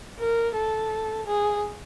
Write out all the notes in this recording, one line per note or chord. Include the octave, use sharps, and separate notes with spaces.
A#4
A4
G#4